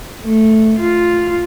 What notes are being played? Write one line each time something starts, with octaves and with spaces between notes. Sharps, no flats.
A3
F4